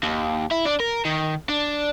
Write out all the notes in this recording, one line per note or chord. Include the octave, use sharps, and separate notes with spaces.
D#2
E4
D4
A#4
D#3
D4